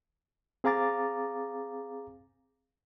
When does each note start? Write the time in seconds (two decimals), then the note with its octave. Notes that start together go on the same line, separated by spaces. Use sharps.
0.64 C4 G#4 F5 A#5 D6 A6